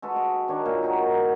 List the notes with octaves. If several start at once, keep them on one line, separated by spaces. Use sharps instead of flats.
G#3 F#4 A4 B4
A4 D#5
D#3 D4 C#5 C#6
A#2 G#4 F5
D#3 D#4 F#4
F#5 A#5